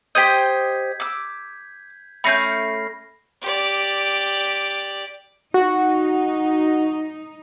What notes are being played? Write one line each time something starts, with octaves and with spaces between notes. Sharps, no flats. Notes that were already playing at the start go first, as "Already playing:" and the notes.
G4 C5 D#5 G6 G#6 B6
D6 E6
A3 C#4 B5 G6 A#6 C7
G4 D5
D#4 F#4